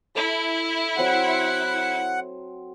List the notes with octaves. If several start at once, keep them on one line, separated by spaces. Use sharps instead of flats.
E4 A4
F#3 C4 F#5 C6